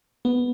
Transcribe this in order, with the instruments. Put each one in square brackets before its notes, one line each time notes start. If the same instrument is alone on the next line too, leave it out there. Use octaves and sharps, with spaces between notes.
[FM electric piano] B3